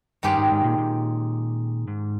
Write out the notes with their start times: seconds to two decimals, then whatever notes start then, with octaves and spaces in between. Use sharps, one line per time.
0.23 G2 D#3 G#3 C#4 G4
0.37 G#2
0.51 G#2
0.64 A#2
0.78 A#2
1.88 G#2